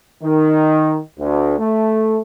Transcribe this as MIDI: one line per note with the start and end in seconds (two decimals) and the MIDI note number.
0.22 0.98 51
1.19 1.57 38
1.58 2.19 57